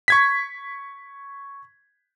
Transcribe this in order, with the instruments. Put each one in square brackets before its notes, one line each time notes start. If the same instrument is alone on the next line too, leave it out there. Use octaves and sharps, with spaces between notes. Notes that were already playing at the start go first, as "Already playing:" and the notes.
[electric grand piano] C#6 G#6 B6